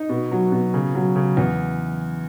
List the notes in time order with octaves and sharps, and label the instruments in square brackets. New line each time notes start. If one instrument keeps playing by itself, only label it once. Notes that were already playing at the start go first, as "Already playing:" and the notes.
Already playing: [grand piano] D#4
B2
F#3
B2
C#3
F#3
C#3
E2